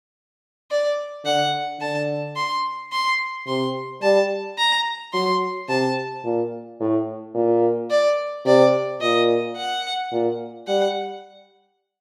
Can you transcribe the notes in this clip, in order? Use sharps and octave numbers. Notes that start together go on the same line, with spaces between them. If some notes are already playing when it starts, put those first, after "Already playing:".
D5
D3 F#5
D3 A5
C6
C6
C3 C6
G3 A5
A#5
F#3 C6
C3 A5
A#2
A2
A#2
D5
C3 D5
A#2 D#5
F#5
A#2
G3 F#5